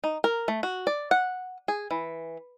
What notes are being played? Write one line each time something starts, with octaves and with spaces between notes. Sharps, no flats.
D#4
A#4
A3
F#4
D5
F#5
G#4
E3